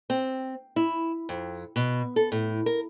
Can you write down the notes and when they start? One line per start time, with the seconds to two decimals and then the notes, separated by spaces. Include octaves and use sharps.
0.10 C4
0.76 E4
1.29 F2
1.76 B2
2.16 A4
2.32 A2
2.66 A#4